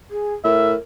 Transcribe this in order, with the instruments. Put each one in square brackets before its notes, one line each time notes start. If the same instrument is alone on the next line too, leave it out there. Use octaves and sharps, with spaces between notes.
[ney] G#4
[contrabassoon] A2 [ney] A#4 [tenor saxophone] E5